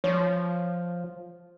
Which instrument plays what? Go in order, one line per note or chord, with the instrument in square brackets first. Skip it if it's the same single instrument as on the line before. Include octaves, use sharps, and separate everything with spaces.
[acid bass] F3 [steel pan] C#5